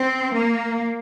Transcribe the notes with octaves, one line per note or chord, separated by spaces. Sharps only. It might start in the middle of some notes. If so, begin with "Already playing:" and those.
Already playing: C4
A#3